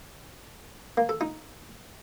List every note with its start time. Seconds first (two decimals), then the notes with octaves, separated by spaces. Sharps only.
0.97 A#3
1.09 A4
1.21 D#4